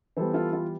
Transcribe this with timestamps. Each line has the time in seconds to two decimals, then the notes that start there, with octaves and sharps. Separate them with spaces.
0.17 E3 G3 B3 A4 C5
0.34 F4 A4
0.53 F4